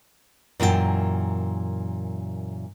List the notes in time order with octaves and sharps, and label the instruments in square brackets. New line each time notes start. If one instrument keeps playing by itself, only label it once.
[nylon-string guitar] F#2 A#2 E3 F#4 G5 G#5